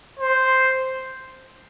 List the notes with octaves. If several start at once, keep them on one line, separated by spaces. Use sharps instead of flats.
C5